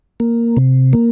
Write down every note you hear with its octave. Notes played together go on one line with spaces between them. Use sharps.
A#3
C3
A#3